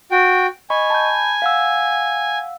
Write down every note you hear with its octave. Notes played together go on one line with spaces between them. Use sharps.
F#4 G5
D#5 G#5 B5 C#6
A5 B5 G6
F5 F#5 E6